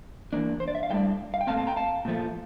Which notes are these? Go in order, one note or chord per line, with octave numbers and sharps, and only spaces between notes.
E3 A#3 D4
C5
D5
E5
F5
A2 G3 D4 E5 G5
F5
G5
A#2 A3 C4 F5 A5
F5 A5
G5 A#5
F5 A5
A#2 F3 A3